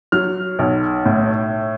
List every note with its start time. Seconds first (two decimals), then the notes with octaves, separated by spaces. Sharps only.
0.12 F#3 F6
0.59 B1
1.06 A2